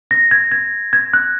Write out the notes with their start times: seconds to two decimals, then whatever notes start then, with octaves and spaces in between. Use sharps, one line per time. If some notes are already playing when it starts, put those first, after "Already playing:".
0.11 A#6
0.31 G#6
0.52 G#6
0.93 G#6
1.13 F#6